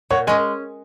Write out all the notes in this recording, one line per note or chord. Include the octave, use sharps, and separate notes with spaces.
A#2 C#5 F#5
G#3 C#4 D#5 G#5